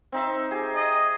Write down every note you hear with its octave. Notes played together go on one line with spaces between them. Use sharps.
C4 D#4 E5
G4 G#4
D#5